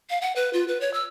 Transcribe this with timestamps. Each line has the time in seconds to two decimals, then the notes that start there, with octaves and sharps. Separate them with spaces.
0.10 F5
0.22 F#5
0.36 B4
0.53 F4
0.68 B4
0.81 C#5
0.94 E6